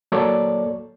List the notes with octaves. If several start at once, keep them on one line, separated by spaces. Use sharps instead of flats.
F#3 A#3 A4 C#5 D5